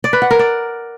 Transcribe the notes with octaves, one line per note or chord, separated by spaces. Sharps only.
D5
B4
F#5
A#4
D5